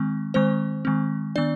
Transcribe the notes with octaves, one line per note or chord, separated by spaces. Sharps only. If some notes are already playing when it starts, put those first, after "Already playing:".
Already playing: D#3 G#3 C4
D#3 G#3 C4 C5
D#3 G#3 C4
D#3 B3 D4 D5